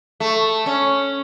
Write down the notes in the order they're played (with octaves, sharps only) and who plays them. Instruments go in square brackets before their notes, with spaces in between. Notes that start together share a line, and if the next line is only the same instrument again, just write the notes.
[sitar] A3
C#4